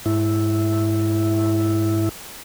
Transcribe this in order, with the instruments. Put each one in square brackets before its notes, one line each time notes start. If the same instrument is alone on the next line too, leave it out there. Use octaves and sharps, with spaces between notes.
[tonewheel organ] G#2 E4